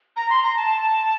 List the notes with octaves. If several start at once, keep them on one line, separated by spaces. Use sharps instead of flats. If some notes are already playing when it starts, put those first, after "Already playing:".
A#5
C6
A#5
A5